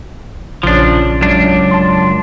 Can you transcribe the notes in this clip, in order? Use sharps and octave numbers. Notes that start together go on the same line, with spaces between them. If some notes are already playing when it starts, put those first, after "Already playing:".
A#1 C#3 F3 C#4 D4
C#2 F#2 D4
A5 C6